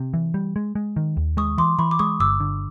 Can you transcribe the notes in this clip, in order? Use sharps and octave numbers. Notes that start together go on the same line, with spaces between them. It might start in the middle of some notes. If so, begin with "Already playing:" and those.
Already playing: C3
E3
G3
G#3
G#3
D#3
D#2
G#3 C#6 D#6
E3 C6 D6
E3 B5 C#6
D6
G#3 C#6 D#6
G1 D6 E6
D3